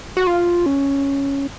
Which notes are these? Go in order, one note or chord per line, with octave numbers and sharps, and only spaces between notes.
F#4
F4
C#4